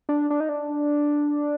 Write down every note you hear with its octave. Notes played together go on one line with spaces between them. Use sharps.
D4
D4
D#4
D4